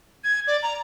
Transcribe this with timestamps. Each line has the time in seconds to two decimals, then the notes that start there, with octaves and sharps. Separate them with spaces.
0.24 G#6
0.47 D5
0.63 A#5